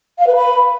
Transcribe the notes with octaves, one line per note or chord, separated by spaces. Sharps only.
F5
B4
B5